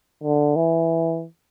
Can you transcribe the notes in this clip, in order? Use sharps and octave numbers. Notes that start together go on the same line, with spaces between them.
D3
E3